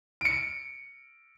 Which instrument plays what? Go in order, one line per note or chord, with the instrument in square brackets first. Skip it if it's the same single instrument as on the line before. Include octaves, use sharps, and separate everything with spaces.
[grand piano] C#7 D7